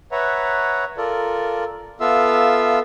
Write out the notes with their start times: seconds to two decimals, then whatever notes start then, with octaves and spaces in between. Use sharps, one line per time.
0.12 B4 C#5 E5 F#5 A#5
0.97 F4 A4 A#4 D5
2.00 B3 F4 A4 E5 F5 E6